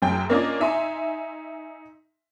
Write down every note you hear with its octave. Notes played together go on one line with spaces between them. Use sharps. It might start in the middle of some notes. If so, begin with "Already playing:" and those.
F#1 F#2 F#3 G5
A#3 C#4 D4 F4 D#5
D#4 E5 G#5 C6